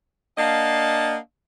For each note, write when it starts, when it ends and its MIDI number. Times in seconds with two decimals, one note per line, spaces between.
0.38 1.17 58
0.38 1.17 62
0.38 1.17 75
0.38 1.17 77
0.38 1.17 78
0.38 1.17 81